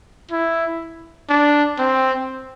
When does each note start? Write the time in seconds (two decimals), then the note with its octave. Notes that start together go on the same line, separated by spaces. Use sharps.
0.31 E4
1.29 D4
1.79 C4